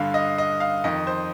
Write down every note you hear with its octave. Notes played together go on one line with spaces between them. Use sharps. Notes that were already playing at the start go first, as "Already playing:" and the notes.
Already playing: G2 D3 F5
D#5
D#5
F5
F2 D#3 D#5
C5